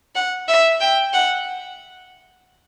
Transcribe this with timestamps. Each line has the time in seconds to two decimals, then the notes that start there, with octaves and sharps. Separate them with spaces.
0.15 F#5
0.49 E5
0.81 G5
1.13 F#5